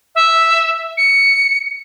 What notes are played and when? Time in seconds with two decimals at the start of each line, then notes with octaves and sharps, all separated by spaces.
0.15 E5
0.97 C#7